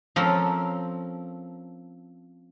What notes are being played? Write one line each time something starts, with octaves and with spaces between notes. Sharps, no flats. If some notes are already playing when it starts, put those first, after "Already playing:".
F3 C4 C#4 A4 A#4